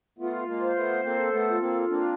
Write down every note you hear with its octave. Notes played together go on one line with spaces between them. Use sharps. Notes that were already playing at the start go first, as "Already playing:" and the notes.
A3 B3 F4
G#3 A#3
C5
A3 B3
A#3 C4 A4
A3 B3
F4
A#3 C4
A#3 C4 D4